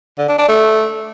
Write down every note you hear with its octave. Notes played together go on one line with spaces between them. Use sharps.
D3
D4
D4
A3